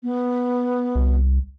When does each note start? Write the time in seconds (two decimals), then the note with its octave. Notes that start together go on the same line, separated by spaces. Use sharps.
0.03 B3
0.95 C2